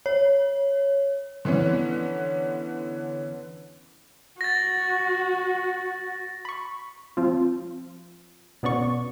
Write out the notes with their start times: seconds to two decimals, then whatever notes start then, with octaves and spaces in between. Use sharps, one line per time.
0.06 C#5
1.45 D3 E3 B3 C#4
4.41 F#4 A6 A#6
6.45 B5 C#6
7.17 F3 C4 F4
8.63 B2 B3 C#4 D5 C#6